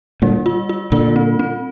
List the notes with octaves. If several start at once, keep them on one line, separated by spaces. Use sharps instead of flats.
A#2 D3 G3
F4
F4
A#2 D3 F4
C4
C4